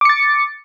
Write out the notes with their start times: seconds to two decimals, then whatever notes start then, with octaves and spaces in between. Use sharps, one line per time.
0.01 D6
0.05 C#7
0.09 A6